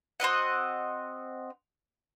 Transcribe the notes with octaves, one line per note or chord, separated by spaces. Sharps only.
C4 F#4 D#5 F#5